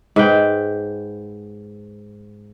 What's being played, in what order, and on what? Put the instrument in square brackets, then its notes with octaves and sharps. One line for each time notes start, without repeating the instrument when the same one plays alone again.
[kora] G#2 B4 G5